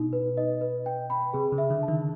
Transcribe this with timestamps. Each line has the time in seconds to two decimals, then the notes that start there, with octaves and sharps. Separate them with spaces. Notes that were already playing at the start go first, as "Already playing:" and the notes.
Already playing: B2 D#4
0.13 B4
0.37 D#5
0.61 B4
0.86 G5
1.10 B5
1.33 C3 G#4
1.52 C#3
1.58 E5
1.70 D3
1.83 A5
1.88 D#3